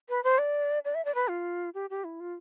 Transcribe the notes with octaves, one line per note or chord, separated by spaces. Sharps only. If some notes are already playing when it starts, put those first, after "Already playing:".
B4
C5
D5
D5
E5
D5
B4
F4
G4
G4
E4
F4